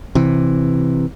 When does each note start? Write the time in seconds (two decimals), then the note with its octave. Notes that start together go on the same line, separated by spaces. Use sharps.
0.15 C3 E3